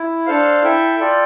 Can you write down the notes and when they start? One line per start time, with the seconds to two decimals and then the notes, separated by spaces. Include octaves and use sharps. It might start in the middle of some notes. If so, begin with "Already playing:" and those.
Already playing: E4
0.26 D4 A4 C5 F5
0.63 E4 A4 E5 G5
0.99 F4 A4 D5 G5